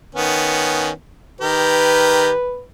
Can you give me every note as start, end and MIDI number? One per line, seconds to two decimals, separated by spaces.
0.15 0.91 51
0.15 0.91 59
0.15 0.91 61
1.41 2.31 51
1.41 2.31 67
1.41 2.31 70
1.41 2.64 71